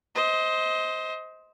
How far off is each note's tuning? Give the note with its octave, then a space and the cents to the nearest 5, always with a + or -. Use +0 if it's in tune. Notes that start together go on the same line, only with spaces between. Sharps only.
C5 +0 D#5 +25